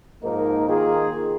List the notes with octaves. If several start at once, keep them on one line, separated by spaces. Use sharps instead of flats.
G#2 F3 A#3 D#4 A#4
D#3 A#3 F4 G#4